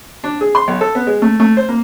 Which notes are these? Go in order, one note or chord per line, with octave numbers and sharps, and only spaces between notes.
D4
G#4
C6
B1
A4
B3
G#3
A3
A3
C5
A#3